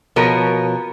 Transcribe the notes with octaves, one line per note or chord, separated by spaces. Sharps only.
B2 F3 A#4 C#5